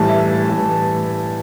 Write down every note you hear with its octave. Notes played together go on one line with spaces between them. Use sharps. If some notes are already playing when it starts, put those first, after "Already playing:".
Already playing: A2 E3 G3 A5
E5
A2 E3 G3